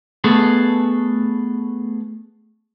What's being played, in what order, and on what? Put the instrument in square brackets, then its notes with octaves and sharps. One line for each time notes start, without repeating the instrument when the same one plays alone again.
[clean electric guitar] A3 B3 G#4 A4